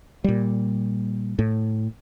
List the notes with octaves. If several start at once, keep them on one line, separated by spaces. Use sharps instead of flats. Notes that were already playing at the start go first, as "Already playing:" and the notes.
A#2 G3
A2